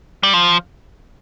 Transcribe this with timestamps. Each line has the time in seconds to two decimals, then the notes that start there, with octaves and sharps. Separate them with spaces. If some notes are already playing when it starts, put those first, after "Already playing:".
0.23 G3
0.33 F3